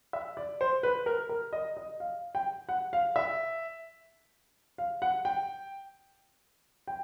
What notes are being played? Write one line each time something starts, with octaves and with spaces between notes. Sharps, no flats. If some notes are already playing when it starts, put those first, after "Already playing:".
E5
D5
C5
B4
A#4
A#4
D#5
D#5
F5
G5
F#5
F5
E5
F5
F#5
G5
G5